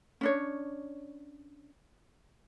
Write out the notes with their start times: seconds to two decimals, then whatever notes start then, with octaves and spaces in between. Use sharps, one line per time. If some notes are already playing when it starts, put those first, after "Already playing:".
0.21 C#4 D4 C#5